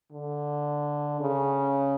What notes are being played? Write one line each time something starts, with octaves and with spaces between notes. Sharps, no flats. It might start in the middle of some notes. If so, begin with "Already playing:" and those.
D3
C#3